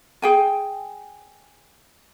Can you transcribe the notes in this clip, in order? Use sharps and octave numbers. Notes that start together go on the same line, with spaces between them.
G#4 G5 G#5